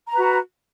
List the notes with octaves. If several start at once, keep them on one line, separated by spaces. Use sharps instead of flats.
F#4 B4 A#5